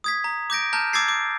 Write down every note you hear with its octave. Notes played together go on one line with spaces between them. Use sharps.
D#6 G#6 B6
A#5
D6 G6 A#6 D7
A5 A#5 F6 G6
D6 E6 G#6 A6 C7
D6